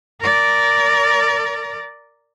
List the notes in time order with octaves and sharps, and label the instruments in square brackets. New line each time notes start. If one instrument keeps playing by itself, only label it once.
[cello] A#4 D5